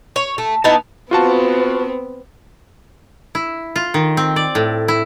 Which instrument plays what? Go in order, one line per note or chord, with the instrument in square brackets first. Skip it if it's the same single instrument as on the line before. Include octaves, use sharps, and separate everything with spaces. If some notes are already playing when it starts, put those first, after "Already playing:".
[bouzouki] C#5
A3
B3 D#4 E4 A5
[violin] B3 C4 [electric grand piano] F4 F#4 A5
[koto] E4
F4
D#3
C4
D5
A2
E4